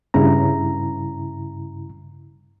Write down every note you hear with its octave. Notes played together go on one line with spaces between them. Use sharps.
G2 C#3 E4 A#5